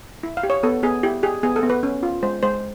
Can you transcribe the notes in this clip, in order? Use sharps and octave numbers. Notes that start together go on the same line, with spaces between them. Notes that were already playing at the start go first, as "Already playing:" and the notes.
E4
F5
G4
C#5
B3 A4
B3 G#4
E4 G4
G4 G#4
B3 G#4
A4
B3
B4
C#4
F4
G#3 C5
G#3 C5